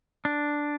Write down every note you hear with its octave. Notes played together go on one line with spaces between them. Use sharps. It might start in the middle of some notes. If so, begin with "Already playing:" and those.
D4